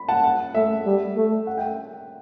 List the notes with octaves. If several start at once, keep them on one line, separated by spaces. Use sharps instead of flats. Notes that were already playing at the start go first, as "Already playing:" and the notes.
Already playing: B5
F#5 A5
F#5
A3 E5
G3
A3
F#5
E5 G5